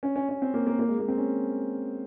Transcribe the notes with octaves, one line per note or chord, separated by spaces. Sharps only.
C#4
C#4
C#4
C4
A#3
A#3
A#3
G#3
A#3
C4
C#4